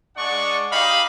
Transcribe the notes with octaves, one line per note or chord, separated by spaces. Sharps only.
G#3 D4 D5 F#5 C#6
D#4 G4 D#5 F5 B5